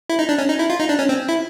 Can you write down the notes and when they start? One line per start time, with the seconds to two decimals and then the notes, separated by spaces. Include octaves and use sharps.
0.09 E4
0.19 D#4
0.29 D4
0.38 C#4
0.49 D#4
0.59 E4
0.70 F4
0.80 D#4
0.89 D4
0.99 C#4
1.09 C4
1.29 E4